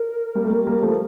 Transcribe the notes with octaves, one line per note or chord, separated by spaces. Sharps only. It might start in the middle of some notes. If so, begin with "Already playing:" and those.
Already playing: A#4
G3 A#3
A3
G3 A#3
G3 A#3
F3 A3